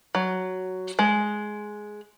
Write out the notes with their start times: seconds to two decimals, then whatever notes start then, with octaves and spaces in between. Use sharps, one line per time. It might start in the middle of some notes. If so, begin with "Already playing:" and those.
0.15 F#3
0.99 G#3